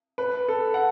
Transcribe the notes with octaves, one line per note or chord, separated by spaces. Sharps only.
B4
A4
F#5